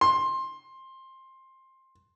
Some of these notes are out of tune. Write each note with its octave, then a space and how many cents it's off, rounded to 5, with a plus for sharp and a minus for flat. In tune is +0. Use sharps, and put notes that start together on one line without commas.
C6 +15